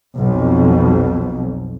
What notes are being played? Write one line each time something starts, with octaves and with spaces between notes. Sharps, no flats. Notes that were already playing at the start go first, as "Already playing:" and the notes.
B1 F2